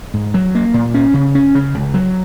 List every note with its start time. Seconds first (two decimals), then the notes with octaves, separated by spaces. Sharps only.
0.14 G#2
0.34 F#3
0.55 A#3
0.74 A#2
0.94 C#4
1.14 C#3
1.35 C#4
1.55 C#3
1.74 C#2
1.94 F#3